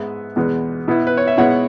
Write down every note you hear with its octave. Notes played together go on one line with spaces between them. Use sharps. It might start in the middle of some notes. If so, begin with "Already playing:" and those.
Already playing: G#2 G#3 B3 B4 E5
E2 B2 G#3 B3
B2 B3 E4
B4
C#5
E5
B2 G#3 B3 E4 C#5 F#5